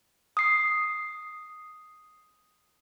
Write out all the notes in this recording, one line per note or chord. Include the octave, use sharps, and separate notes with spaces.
D#6 C7